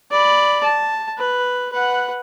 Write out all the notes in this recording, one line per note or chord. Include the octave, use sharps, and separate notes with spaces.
D5 B5
A5
B4
B4 F#5